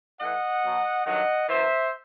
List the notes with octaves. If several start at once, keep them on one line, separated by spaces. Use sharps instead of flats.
A2 E3 D#5 F#5
B2 F#3
G2 D#3 F#3 D#5 F#5
F#2 E3 C5 E5